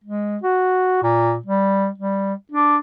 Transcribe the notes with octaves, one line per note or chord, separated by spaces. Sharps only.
G#3
F#4
A#2
G3
G3
D4